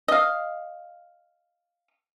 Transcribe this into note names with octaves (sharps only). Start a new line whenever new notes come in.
D#5 F5